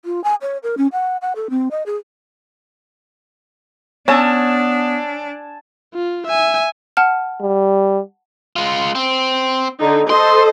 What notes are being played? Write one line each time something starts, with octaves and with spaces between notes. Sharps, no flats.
F4
G#5
C#5
A#4
C#4
F#5
F#5
A4
C4
D#5
G#4
B3 C#4 D4 G#5 A5 E6
F4
E5 G#5
F#5 A5 F6
G3
G#3 F4
C4
D3 D#4
A4 C5 D#5 C6